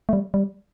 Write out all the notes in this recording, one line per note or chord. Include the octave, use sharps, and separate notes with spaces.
A3
G3
G3